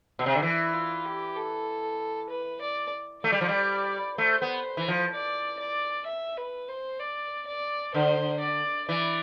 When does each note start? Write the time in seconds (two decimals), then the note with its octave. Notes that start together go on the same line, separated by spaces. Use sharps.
0.19 B2
0.26 C3
0.35 D3
0.42 E3 E4
0.74 F4
1.05 G4
1.36 A4
2.30 B4
2.61 D5
3.24 A3 D5
3.32 G3
3.41 F3
3.48 G3
4.18 A3 C5
4.42 B3
4.77 E3
4.88 F3
5.12 D5
5.59 D5
6.06 E5
6.37 B4
6.69 C5
6.99 D5
7.47 D5
7.94 D3 C5
8.41 D5
8.88 E3 D5